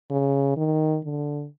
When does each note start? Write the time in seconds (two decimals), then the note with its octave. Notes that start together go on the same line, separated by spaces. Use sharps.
0.11 C#3
0.57 D#3
1.04 D3